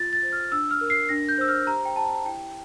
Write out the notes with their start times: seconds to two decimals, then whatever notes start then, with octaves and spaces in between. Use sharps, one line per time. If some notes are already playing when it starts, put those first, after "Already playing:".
Already playing: F4 A6
0.13 A6
0.23 C5
0.32 F6
0.52 D4 E6
0.71 F6
0.81 A#4
0.90 C7
1.09 D4 A#6
1.29 G6
1.38 C5 E6
1.48 F6
1.67 G4 A#5
1.85 G5
1.96 G4 A5
2.26 E4 G5